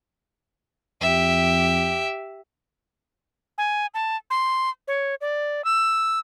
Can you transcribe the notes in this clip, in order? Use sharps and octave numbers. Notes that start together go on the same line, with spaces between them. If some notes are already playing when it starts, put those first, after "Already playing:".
F2 G4 E5
G#5
A5
C6
C#5
D5
E6